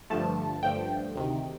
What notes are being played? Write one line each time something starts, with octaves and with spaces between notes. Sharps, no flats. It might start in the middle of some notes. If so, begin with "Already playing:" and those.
G2 D3 F3 A3 A5
G2 D3 F3 A3 G5
D2 C3 D#3